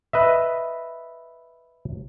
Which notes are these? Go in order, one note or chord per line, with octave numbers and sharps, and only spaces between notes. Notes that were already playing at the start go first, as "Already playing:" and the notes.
B4 D#5 E5